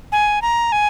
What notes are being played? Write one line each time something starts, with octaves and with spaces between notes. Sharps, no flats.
G#5
A#5
G#5